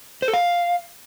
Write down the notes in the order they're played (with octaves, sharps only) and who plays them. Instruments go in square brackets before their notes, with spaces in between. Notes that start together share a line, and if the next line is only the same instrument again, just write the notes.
[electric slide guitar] C5
A4
F5